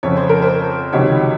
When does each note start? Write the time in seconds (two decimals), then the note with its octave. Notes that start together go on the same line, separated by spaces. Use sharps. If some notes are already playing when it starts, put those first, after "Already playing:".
0.03 F2 C#3 F3 C#5
0.17 C5
0.29 A#4
0.42 C5
0.93 C#2 C3 D#3 F#3 C#5